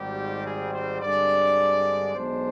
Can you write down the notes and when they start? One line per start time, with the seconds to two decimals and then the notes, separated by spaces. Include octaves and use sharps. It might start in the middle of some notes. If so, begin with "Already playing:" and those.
Already playing: G#1 G#2 D#3 G3 C4 G4
0.46 G#4
0.74 C5
1.02 G2 D3 G#3 C4 D5
2.14 B1 B2 G#3 D4 C5